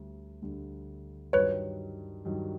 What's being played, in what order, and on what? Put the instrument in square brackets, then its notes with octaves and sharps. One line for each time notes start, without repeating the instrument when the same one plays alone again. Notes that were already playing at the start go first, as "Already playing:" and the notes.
Already playing: [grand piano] D2 D3 G3
D2 D3 G3
[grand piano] G2 D#3 F#3 [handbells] B4 C#5
[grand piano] G2 D#3 F#3